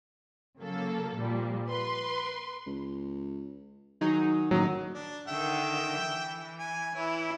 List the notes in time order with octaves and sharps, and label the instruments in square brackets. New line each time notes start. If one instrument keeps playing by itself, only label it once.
[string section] C#3 F#3 A#3 A4
A#2 F3 G3
B4 C6
[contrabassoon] C#2
[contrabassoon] D#3 [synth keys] F#3 D#4 G#4
[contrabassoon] F#1 [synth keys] A2 D#3 D#4 [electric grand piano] F#3
[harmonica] D4
[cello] D3 D#3 [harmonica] E5 G5
[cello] E3
[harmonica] G#5
[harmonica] E3 C#5 [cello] E4